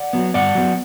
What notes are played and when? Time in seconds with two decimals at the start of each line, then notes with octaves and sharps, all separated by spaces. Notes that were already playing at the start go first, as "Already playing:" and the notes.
Already playing: D5 F#5
0.13 F#3 B3
0.34 G2 D5 F#5
0.55 F#3 B3